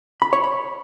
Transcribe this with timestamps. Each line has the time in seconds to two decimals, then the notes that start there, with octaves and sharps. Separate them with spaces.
0.22 B5
0.33 C#5
0.44 B5